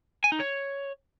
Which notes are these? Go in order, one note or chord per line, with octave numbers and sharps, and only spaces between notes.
G#5
D#4
C#5